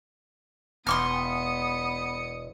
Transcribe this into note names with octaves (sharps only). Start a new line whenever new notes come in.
E1 B3 C6 C#6 D#6 F6 C#7